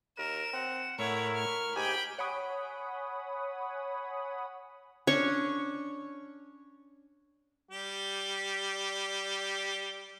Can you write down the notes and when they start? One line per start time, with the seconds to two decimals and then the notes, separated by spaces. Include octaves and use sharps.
0.18 D#2 A#4 E7
0.53 C4 F#5
0.99 A2 E4 A#4 C#5 F#5
1.35 C#6 F6
1.76 G#2 G4 G#4 G5 G#5 B5
2.19 C#5 F#5 G#5 B5 D#6
5.07 C#4 D4 C#5 C#6
7.71 G3 G4